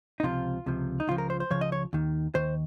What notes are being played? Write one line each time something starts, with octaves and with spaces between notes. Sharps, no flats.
D#4
C#2 C3 F3 F4
C#2 C3 F3
D#4
C#2 C#3 F3 F4
A#4
C5
C5
C#2 C#3 F3 C#5
D#5
C#5
D#2 D#3
D#2 D#3 C5